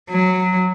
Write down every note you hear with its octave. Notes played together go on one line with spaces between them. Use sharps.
F#3